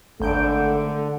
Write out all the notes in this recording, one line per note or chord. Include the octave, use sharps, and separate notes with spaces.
G#1 D3 A3 G6 D7